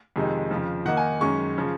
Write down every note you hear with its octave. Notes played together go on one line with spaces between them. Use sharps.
F2 C3 D#3 G#3 D#4
F2 C#3 F3
D#3 A#3 D#4 F#5
G#5
F#2 D#3 G#3 C#4 C#6
C#3 F3